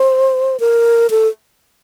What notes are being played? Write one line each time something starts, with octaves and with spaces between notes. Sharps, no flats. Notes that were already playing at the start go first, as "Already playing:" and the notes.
Already playing: C5
A#4
A4